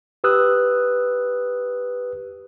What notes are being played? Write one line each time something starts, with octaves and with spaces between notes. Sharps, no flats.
G4 B4 D#6 E6 F#6